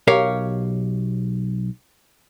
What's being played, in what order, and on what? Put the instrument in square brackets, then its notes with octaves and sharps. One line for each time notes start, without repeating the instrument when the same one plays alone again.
[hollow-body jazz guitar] B1 G4 A#4 C#5 F5